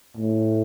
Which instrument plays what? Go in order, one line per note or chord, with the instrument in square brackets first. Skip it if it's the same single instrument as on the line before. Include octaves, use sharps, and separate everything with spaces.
[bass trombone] A2